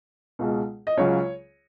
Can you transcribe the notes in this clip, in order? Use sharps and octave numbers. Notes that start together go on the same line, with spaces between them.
C#2 B2 G#3
D#5
C#2 C#3 F#3 C#5